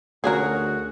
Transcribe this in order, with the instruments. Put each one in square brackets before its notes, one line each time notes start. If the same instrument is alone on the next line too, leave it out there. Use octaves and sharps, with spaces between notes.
[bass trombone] D2 [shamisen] F3 C#4 A#5 [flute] F#4 [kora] G#4 A#4